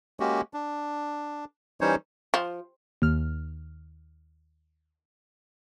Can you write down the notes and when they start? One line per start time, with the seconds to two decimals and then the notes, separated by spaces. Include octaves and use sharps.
0.20 G#3 A#3 C#4 F#4 G4
0.54 D4
1.81 E3 G3 C#4 D#4 C5 C#5
2.34 F3
3.02 D#2 F6